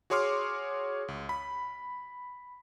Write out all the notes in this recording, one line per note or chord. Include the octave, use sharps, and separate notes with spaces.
F#4 G#4 C#5 C6 D6 F6
C#2
B5